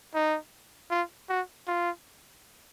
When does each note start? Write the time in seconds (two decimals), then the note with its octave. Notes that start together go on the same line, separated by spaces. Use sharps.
0.14 D#4
0.90 F4
1.29 F#4
1.67 F4